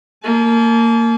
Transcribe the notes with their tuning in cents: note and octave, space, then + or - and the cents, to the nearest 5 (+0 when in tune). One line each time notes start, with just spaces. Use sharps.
A#3 -20 A5 -45